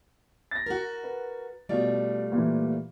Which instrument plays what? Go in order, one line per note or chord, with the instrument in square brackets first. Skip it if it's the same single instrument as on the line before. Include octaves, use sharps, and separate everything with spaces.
[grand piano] A6 A#6
[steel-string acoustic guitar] F#4 A#4
[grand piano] B4
[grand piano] B2 D5 [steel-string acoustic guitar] G3 A3 F4
[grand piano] A#2 E3